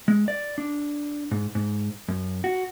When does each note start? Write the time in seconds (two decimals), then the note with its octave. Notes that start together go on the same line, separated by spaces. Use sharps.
0.08 G#3
0.28 D5
0.58 D4
1.31 G#2
1.55 G#2
2.08 F#2
2.44 F#4